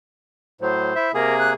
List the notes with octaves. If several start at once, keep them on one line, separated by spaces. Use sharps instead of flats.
A2 F#3 C5
E4 E5
C3 A#3 G#4 A#4
F#6